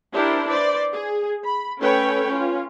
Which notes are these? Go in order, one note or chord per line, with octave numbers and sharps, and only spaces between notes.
D4 E4 G4 A#4 C5
B4 C5 D5
G#4
B5
A3 C#4 A4 B4 C#5 G5
C#4 F4